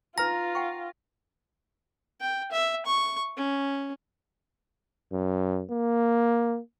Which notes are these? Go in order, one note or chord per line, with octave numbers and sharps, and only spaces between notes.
D#4 F4 B4 G#5 A#5 F6 A#6
F#5 G5 C#6
G5
E5
C#6
C#4
F#2
A#3